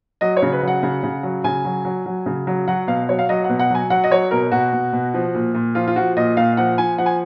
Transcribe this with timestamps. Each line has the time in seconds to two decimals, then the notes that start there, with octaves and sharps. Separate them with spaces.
0.21 F#3 D#5
0.37 C#5
0.42 C#3
0.52 B4
0.62 F#3
0.68 F#5
0.83 C#3
1.03 C#3
1.23 F#3
1.44 C#3 G#5
1.65 F#3
1.85 F#3
2.06 F#3
2.26 C#3
2.47 F#3
2.68 F#3 F#5
2.88 B2 F5
3.09 F#3 C#5
3.19 F5
3.29 F#3 D#5
3.44 F#5
3.49 B2
3.59 F#5
3.70 F#3 G#5
3.90 F#3 F#5
4.04 D#5
4.11 F#3 C#5
4.31 B2 A#4
4.52 B2 F#4
4.73 B2
4.93 B2
5.14 F3
5.35 A#2
5.54 A#2
5.75 F3 F4
5.87 F4
5.96 F3 F#4
6.17 A#2 D#5
6.37 A#2 F5
6.57 F3 F#5
6.78 F3 G#5
6.98 F3 F#5
7.06 G#5